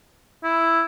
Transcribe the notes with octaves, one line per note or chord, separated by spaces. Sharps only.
E4